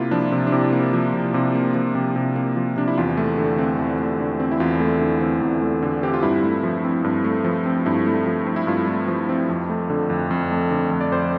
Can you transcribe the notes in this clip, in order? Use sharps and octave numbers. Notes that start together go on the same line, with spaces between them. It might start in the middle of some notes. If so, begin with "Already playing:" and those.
Already playing: C3 A#3 E4 F4
F3 D4
C3
D4
C3 E4
A#3
F3
C3
C3 F4
A#3
F3
C3
C3
A#3
F3
C3 D4
E4
E2 F4
A3
D3
C4
E2
A3
D3
C4
E4
E2 F4
A3
D3
C4
E2
A3
D3
C4 G4
F4
G2 E4
A3
F3
C4
G2
A3
F3
C4
G2 E4
A3
F3
C4
E4
G2 F4
A3
F3
C4
F2
A3
D3
F2
F2
A3
D3
F2
D5
F2 C5